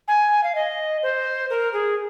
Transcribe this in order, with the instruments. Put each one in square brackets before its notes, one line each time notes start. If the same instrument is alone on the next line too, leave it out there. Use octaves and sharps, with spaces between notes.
[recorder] G#5
F5
D#5
C5
A#4
G#4